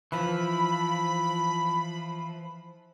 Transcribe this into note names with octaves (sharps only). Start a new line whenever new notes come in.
E3 F3 B5